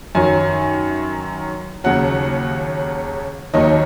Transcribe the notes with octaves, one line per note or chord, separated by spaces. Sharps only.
F#2 D#3 F#3 G#5
D#2 C#3 F#3 F#5
D#2 D#3 F#3 D#5